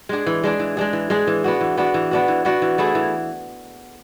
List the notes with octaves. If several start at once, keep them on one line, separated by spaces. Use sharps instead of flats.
G#3 D4 G#4
E3
G#3 D4 G#4
E3
G#3 D4 G#4
E3
G#3 D4 G#4
E3
B3 D4 F#4
E3
B3 D4 F#4
E3
B3 D4 F#4
E3
B3 D4 F#4
E3
A3 E4 G#4
E3